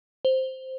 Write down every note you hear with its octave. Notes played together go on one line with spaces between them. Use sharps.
C5